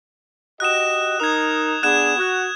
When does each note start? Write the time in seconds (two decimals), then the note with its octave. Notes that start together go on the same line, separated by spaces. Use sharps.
0.60 F#4 G4 D#5 F#6 E7
1.20 D#4 A#4 D#6 G#6
1.83 B3 D4 G#4 F#6 G#6 E7
2.17 F#4